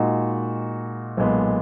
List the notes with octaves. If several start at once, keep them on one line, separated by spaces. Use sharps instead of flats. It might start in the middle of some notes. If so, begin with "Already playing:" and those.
Already playing: A#2 G#3 D#4 F#4
B1 A#2 G#3 B3